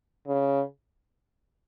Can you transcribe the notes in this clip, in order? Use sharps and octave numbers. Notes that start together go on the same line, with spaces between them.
C#3